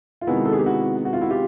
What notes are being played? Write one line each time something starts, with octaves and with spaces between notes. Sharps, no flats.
F4
C3 D#3 G#3 B3 E4 F#4
A4
G#4
G4
E4 F#4
F#4
F4
E4 F#4
F4 G4